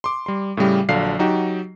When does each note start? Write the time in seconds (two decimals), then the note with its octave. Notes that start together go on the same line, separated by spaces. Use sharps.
0.04 C6 D6
0.26 G3 C6
0.57 A2 C#3 G3 G4
0.89 A#1 D3 F#3 D4 F5 C7
1.19 F#3 D#4 F#4 G4